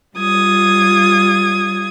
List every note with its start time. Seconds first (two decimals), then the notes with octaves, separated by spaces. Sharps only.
0.16 G3 F4 D#6 G#6